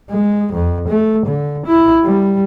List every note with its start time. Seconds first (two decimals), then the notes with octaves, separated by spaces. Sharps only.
0.10 G#3
0.54 F2
0.88 A3
1.27 D3
1.67 E4
2.04 G3